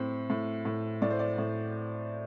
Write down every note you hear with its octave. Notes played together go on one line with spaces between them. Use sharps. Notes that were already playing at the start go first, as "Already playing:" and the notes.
Already playing: A2 C4
A2
A2
A2 D5
C5
D5
A2